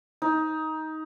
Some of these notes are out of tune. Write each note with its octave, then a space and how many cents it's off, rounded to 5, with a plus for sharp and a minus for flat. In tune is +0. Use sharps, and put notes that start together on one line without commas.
D#4 +15